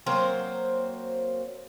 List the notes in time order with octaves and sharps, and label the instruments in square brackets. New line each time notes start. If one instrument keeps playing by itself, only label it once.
[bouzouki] F#3 A#3 C4 C5